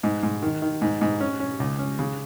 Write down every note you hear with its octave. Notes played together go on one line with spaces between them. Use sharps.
G#2
G#2
D#3
D#3
G#2
G#2
C#4
C#4
C#2
C#4
C#3